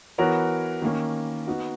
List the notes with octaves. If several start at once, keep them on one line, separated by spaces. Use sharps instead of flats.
E3 B3 F#4 A#4 C#5
D#3 A#3 C#4
B3 D#4 F#4